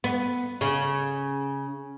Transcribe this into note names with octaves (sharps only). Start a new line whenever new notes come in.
B3
C#3